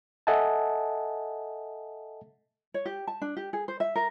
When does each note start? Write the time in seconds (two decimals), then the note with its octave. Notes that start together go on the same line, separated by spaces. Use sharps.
0.27 A4 D#5 E5 F#5 G#5 A5
2.74 C#5
2.85 G4
3.07 A5
3.22 D4
3.37 G4
3.53 G#4
3.68 C5
3.80 E5
3.95 A#4